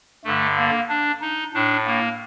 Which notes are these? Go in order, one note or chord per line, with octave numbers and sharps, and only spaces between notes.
G2 D3 A3
A#3
D4
D#4
A2 D4
A#3